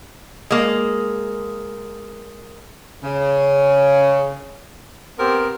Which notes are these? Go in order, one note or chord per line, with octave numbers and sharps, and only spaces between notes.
G#3 A#3
C#3
B3 C4 G4 A#4